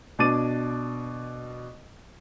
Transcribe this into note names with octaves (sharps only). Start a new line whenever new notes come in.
B2 D4 D6 A6 D#7